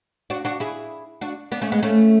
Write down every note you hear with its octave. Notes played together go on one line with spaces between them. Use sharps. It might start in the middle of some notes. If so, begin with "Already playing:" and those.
D4 F#4
D4 F#4
E4 G#4
D4 F#4
B3 D4
A3 C#4
G#3 B3
A3 C#4